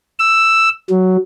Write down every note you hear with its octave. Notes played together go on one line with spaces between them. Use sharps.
E6
F#3